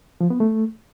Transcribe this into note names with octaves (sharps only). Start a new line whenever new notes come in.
F3
B3
A3